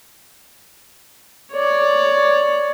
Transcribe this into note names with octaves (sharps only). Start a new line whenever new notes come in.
C#5 D5